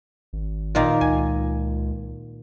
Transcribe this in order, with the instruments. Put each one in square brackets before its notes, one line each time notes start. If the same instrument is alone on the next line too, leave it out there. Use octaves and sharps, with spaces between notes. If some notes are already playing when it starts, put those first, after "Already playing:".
[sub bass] G#1
[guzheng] A#2 D#3 A#3
[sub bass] C#2 [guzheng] G#5